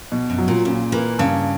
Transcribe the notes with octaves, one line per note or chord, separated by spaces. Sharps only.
B2
F#2
F#3
A#2
A#2 C#3
E3 A#3
G2 C#3